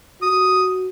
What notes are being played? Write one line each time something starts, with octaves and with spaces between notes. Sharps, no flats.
F#4 D#6